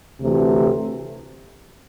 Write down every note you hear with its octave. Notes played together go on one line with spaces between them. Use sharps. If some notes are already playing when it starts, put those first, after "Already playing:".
D2 C3 E3 A3